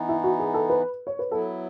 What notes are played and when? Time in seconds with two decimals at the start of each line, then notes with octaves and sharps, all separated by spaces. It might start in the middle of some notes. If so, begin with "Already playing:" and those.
Already playing: E3 B3 D#4
0.09 E4
0.24 F#4
0.39 G#4
0.54 A4
0.70 B4
1.07 C#5
1.19 B4
1.31 F#3 B3 E4 A4